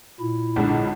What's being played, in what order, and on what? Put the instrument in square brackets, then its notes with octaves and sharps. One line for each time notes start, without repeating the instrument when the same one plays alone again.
[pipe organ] A#2 E4
[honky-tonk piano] B1 G#2 D3